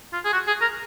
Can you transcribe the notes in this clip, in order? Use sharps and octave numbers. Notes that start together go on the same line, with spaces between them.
F4
G#4
F#4
G#4
A#4